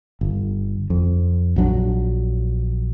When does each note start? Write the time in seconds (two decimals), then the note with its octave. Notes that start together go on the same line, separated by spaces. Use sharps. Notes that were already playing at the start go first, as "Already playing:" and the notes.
0.21 G1
0.90 F2
1.56 A#1 F#3 D4